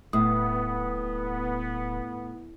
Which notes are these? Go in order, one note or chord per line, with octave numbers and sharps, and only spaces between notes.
D1 A2 B3 D#6